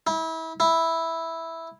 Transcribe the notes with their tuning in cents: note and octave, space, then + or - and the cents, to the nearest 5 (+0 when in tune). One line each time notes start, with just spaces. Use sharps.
E4 -30
E4 -5